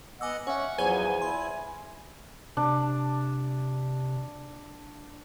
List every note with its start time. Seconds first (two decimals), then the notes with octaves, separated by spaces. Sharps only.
0.21 B3 D#5 F#5 G#5 D6 E6
0.47 C#4 C#5 E5 F#5
0.78 E2 F3 F#3 B3 C5 G#5
1.22 E4 C6
2.57 C3 D4